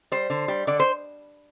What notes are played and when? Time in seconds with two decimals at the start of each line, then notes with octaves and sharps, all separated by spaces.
0.12 G3 C5
0.30 D3
0.48 G3
0.67 D3 D5
0.80 C5